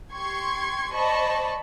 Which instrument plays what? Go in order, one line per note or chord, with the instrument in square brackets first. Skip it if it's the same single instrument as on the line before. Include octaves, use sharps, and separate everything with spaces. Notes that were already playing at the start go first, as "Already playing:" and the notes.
[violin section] G4 C6 C#6 G#6
C5 D5 D#5 A5 B5 C#6